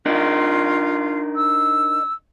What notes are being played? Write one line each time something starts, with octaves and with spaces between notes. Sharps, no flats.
D4 D#4 F4 A#4
E6